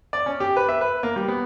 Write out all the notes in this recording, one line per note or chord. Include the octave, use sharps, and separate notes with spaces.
D5
C#4
G4
B4
E5
B4
A#3
G3
B3